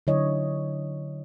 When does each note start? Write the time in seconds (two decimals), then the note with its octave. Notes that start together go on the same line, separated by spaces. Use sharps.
0.07 D3 F#3 E4 C#5 D#5